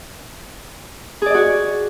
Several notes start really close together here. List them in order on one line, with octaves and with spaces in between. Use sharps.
G#4 D5 D#5 F#4